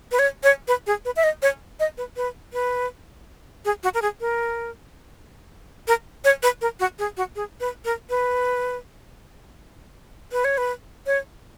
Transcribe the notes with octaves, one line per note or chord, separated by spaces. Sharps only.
B4
C#5
C#5
B4
G#4
B4
E5
D#5
C#5
D#5
B4
B4
B4
G#4
F#4
A#4
G#4
A#4
A#4
C#5
B4
A#4
F#4
G#4
F#4
G#4
B4
A#4
B4
B4
C#5
B4
C#5